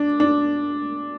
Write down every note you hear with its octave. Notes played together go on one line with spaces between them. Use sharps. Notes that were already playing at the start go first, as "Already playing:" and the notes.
Already playing: D4
D4